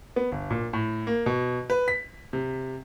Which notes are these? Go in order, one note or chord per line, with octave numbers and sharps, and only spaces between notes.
B3
G1
A#2
A2
A#3
B2
B4
B6
C3